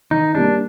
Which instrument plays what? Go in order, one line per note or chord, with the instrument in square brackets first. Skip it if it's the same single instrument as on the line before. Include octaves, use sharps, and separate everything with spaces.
[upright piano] D#3 [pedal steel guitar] D#4
[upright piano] G3 A#3 [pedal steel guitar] D4